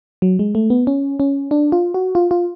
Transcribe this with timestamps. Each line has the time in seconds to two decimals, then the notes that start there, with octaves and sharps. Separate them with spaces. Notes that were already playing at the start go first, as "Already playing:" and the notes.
0.22 F#3
0.39 G#3
0.55 A3
0.70 B3
0.87 C#4
1.20 C#4
1.51 D4
1.72 F4
1.94 F#4
2.15 F4
2.31 F4